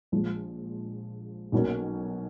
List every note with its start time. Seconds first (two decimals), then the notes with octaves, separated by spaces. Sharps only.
0.12 A#1 A#2 F3 G#3
1.52 B1 B2 F#3 A#3 C#4